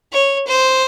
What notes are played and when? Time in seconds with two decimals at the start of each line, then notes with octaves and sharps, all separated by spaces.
0.12 C#5
0.47 C5